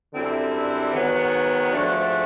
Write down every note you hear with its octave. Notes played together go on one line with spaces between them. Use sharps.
F#2 D3 G3 C4 E4
G#2 D#3 F#3 B3
G#2 F3 A3 D4 F#4